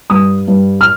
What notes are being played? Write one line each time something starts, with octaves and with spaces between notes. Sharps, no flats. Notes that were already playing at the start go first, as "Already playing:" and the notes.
G2 D#6
G2
F6